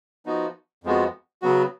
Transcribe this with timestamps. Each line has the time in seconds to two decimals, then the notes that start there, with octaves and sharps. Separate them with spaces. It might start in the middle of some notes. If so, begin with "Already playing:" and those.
0.26 F3 B3 D#4 F#4
0.84 F2 F3 G#3 B3 F#4
1.42 C#3 F#3 B3 F#4